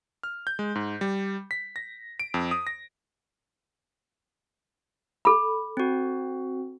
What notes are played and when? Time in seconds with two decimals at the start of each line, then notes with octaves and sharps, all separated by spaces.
0.23 F6
0.47 G6
0.59 G#3
0.75 G#2
1.01 G3
1.51 B6
1.76 A#6
2.20 D7
2.34 F2
2.51 D#6
2.67 A#6
5.25 A4 B5
5.77 C4 F#4